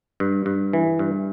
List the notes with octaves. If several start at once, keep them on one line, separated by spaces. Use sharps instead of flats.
G2
G2
E3
G2